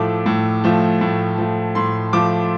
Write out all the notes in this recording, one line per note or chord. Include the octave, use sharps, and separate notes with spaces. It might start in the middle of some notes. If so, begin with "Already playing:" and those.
Already playing: A2 F3 A3 D6 E6
A2
F3 A3
A2
F3 A3
A2 C6
F3 A3 D6